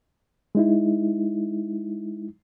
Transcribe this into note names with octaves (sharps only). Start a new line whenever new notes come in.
G#3 D#4 E4